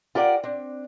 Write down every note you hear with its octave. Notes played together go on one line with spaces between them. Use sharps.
F4 G4 A#4 D5 F#5
C4 D4